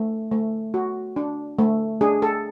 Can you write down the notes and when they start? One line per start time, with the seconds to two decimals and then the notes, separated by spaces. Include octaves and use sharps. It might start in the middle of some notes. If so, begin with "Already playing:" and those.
Already playing: A3
0.32 A3
0.74 F#4
1.16 D4
1.59 A3
2.01 D4 G#4
2.22 A4